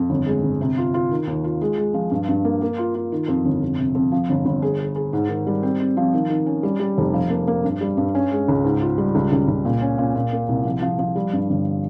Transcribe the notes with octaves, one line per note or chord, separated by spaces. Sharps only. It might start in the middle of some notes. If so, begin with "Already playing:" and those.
Already playing: F2
G1
G#3
G1
C3
F4
F4
D#3
D#2
F4
G#3
G#3
F3
G2
G2
A#3
A#3
F4
F4
D#3
F2
G1
F2
C3
F2
F3
G1
G1
G#4
G#4
G#4
G#2
D#3
G3
C4
C4
F3
D#3
D#3
C#4
G3
G3
F1
F3
A#3
A#3
G2
G3
G2
C#4
G#3
C#2
G#2
F4
G3
C#2
C#2
C#2
A#2
C#4
A#2
A#2
A#3
C2
F3
F3
F3
G3
G2
G1